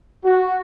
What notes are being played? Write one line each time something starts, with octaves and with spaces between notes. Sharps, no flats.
F#4